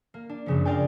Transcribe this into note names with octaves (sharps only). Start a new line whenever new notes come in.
A#3
D4
F#2 C#3 F3
D4 F4 A#4 D5 G5 G#5